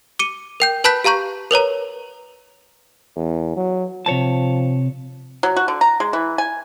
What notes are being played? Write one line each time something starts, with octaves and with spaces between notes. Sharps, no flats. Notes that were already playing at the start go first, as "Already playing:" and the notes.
D6 C#7 D#7
A#4 G5 G6
B4 A5 B5 F#6 G6 B6
G4 F5 A#5 C#6 G6
A#4 B4 C#5 A#5
E2
F#3
C3 F3 C#5 A5
F#3
F#4
D3
A#5
G#3
E3
G#5